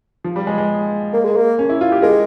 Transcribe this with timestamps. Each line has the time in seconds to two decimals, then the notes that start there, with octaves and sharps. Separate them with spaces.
0.24 F3
0.36 G3
0.47 G#3
0.58 G#3
1.13 A#3
1.25 G#3
1.36 A#3
1.59 C#4
1.69 E4
1.81 F4
1.92 G4
2.02 G#3 A#4